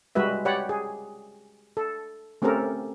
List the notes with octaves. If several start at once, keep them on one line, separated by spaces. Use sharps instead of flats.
G3 G#3 F#4 B4 E5
G4 C#5 D5 F#5 B5
G#4
A4
A3 C4 C#4 G4 A4 A#4